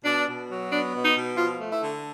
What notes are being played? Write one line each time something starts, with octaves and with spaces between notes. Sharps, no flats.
B2 D4
B2
F#3
B3 D4
B2
D#4
B2
F3 F4
A3
E4
D3